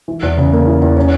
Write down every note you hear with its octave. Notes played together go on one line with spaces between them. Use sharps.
E3
E2
C#3
A#3
E3
E2
C#4